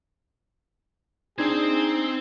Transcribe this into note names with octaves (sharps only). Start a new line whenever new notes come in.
C4 D4 D#4 G#4 C5 G#6